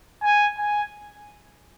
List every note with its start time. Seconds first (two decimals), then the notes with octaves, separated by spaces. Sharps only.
0.24 G#5
0.58 G#5